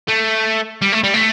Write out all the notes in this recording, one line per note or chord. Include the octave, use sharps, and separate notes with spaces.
A3
G3
A3
G3
A3